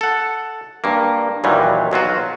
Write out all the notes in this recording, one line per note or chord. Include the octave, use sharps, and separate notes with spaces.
A4 F#5
G2 A#3
D#2 A#2 E3 F#3 G3
B1 F#3 F4 F#4